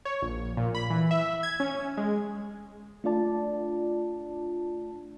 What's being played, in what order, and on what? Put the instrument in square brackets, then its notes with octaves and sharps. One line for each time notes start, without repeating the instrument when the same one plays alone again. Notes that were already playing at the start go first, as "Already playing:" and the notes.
[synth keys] C#5
A#1
A#2
B5
E3
E5
G#6
C#4
G#3
[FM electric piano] A3 D4 F4 D5 A5